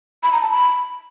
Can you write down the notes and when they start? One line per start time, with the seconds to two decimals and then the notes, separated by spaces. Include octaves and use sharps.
0.23 B5
0.32 A#5
0.42 A5
0.51 B5